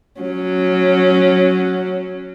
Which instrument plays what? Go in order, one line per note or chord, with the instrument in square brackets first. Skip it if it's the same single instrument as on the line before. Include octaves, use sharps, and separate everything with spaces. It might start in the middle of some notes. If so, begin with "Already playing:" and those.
[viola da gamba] F#3 C#4